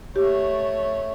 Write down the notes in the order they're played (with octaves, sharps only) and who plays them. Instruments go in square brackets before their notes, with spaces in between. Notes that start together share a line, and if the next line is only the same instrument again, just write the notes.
[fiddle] A3 C#5 [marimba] G4